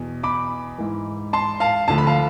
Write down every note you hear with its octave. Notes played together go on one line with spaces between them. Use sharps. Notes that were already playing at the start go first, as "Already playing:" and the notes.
Already playing: E2 B2
B5 D6
G#2 E3
A5 C6
F5 A5
D2 D3 F3 A5
B5
F5 A5